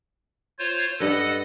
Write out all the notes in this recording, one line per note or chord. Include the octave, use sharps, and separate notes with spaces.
F4 C5 C#5
G2 A4 B4 D#5 F#5